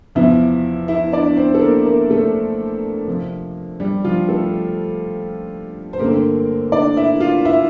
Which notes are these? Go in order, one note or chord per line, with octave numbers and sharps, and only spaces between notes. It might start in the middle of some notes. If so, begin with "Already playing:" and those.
E2 C3 F3 E4 E5
E4 E5
D4 D5
C4 C5
A4
A#3 A#4
A#3 A#4
A3 A4
F2 C3 F3
G3 G4
F3 F4
A3 A4
C5
G2 D3 A3 A#3 C4 A#4
D4 D5
E4 E5
F4 F5
E4 E5